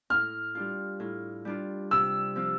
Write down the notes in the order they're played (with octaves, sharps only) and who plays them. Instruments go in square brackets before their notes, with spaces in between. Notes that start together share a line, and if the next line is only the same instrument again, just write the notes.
[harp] A2 [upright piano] F6
[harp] G3 D4 F4
A2
G3 D4 F4
[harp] C3 [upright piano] E6
[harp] F3 C4 F4